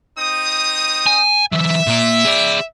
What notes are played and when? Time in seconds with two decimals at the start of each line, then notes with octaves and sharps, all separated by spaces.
0.17 C4 D#4 D#6
1.06 G#5
1.52 E3 F#3 E5
1.87 A#2 A#3
2.25 G#4 D5